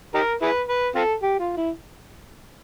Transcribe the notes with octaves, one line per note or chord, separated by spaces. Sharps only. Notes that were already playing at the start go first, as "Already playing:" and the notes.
D#4 G4 A#4
E4 G#4 B4
B4
C4 F4 A4
G4
F4
E4